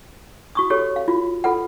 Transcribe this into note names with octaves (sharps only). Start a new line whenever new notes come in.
F#4 C#6 D#6
F#4 G4 A4 C#5
F5
F4 F#4
F4 A4 B4 F#5